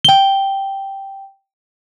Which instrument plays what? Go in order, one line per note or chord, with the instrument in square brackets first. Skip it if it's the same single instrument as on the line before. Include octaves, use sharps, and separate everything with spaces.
[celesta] G5 G7